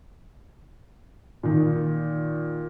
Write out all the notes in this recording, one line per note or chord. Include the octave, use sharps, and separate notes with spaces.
A#2 D#3